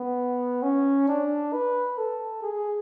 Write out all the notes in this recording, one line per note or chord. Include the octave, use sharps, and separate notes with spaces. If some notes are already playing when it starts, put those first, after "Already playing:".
Already playing: B3
C#4
D4
B4
A4
G#4